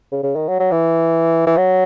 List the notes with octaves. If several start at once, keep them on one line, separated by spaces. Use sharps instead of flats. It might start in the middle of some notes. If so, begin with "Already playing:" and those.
C#3
C#3
D#3
F#3
F#3
E3
E3
F#3